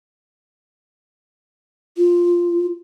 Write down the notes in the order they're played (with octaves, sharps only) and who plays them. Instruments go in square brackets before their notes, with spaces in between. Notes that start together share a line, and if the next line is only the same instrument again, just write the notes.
[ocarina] F4